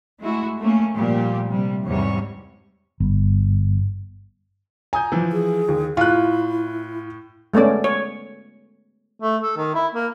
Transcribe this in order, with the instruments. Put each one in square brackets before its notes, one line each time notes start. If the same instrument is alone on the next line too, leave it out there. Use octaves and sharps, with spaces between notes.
[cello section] G#3 A3 E4 F#4
A3 A#3 C#4
A#2 F3 G3 G4
C3 G3
E2 G#2 C3 G3 C#5
[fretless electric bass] G1
[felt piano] G#5 [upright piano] A#5 D#6 G6
[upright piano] E3 F3
[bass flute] G#4
[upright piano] D#2
[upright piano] A2 [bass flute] E4 [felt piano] F4 F#6
[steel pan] G#3 A3 B3 C#4 D5
C#5
[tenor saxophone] A3
A4
D#3
E4
A#3